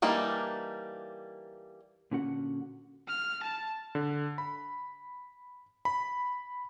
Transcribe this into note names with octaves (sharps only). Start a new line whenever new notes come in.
E3 G3 A#3 D4 D#4
A#2 D3 C#4 F#4 F#5
F6
A5
D3
B5
B5